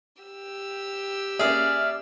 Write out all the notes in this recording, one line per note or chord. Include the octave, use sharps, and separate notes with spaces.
G4 E6
A#3 C#4 G#4 D5 E5 F6